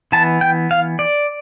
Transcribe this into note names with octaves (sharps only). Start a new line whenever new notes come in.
E3 B3 A5
G5
F5
D5